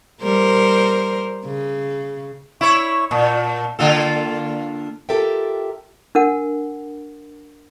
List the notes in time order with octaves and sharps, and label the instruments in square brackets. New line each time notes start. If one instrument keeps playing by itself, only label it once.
[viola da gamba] G3 A#4 C5
C#3
[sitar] E4 C#5 [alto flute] C#6
[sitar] A#2 [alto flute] A5
[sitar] D3 F4 A4 [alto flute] A#3
[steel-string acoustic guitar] F4 G4 A4 A#4 E5 G5
[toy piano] D4 A#4 F#5